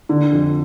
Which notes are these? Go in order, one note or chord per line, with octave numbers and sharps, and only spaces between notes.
D3
F2